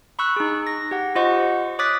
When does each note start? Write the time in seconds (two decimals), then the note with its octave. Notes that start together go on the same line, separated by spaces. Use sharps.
0.19 B5 C#6 E6 F#6
0.36 D#4 G#4
0.67 A#6
0.91 G4 F#5
1.15 F4 C5 D#5 F#5 C#6
1.79 C#5 D6 D#6 F#6 A6 B6